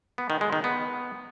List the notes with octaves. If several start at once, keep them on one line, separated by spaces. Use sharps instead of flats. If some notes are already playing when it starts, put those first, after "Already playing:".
B3
D#3
G#3
D#3
B3